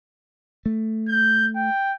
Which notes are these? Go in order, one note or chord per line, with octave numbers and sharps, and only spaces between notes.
A3
G6
G5